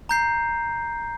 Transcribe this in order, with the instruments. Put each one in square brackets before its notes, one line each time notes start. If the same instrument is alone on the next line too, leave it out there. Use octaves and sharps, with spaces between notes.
[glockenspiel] A#5 G6 C7